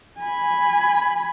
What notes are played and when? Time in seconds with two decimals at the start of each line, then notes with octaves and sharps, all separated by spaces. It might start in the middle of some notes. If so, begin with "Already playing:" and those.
0.20 G#5 B5